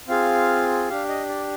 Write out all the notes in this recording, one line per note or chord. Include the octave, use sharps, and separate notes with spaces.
C4 F4 G#4 F5
D4 G4 F5
D#5
D5